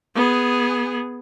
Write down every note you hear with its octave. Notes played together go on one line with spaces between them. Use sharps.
B3 G#4